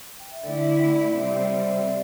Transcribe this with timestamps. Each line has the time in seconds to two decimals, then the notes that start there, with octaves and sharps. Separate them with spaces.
0.20 G5
0.31 E5
0.43 D3 A3 E4 A4 D5
0.79 D5 G5
1.13 C3 G3 C4 E5
1.26 D5
1.39 C5 E5
1.72 E5
1.84 A4 D5